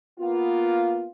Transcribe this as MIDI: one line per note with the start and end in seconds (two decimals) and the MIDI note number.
0.20 1.07 58
0.20 1.07 59
0.20 1.07 65